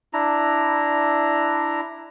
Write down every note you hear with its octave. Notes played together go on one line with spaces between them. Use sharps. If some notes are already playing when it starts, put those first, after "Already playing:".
D4 E4 A#5